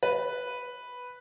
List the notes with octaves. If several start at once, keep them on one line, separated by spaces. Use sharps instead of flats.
B4